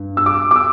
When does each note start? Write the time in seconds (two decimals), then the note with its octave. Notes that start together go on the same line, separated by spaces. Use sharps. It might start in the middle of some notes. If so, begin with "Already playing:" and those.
Already playing: G2
0.17 E6
0.26 D6
0.51 D6
0.56 E6